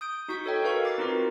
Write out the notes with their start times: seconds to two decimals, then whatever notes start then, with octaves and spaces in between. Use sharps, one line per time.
0.01 D#6 G6 D7
0.28 D#4 F#4 C#6 G6 B6
0.46 A4 C#5 D#5 G5
0.62 F#4 A#4 B4 F5 C#6
0.85 D6 A6 C7
0.98 C4 D#4 F4 F#4 A#4 B4